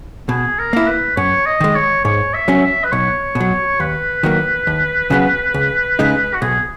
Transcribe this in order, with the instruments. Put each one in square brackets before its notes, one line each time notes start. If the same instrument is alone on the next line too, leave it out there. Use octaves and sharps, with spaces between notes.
[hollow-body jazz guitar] B2 [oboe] G#4
[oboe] A#4
[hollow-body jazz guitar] A#3 E4
[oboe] B4
[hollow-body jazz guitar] F#2 [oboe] C#5
[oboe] D#5
[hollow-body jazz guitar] D#3 G#3
[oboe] C#5
[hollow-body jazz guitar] G#2 [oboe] C#5
[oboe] E5
[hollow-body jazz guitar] F#3 C#4
[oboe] E5
B4
[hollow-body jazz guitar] B1 [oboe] C#5
[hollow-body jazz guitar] B2
F#3
[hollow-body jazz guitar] D#2 [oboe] B4
[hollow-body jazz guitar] D#3 F#3 A#3
D#2
C#3 F#3 B3
C#2
C#3 G#3 D#4
[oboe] F#4
[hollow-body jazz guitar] B1 [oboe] G#4